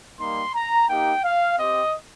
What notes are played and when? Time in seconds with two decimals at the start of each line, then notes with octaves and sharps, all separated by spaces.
0.19 G3 A#3 D#4 C6
0.55 A#5
0.88 A#3 D#4 G4 G5
1.24 F5
1.58 C4 G4 D#5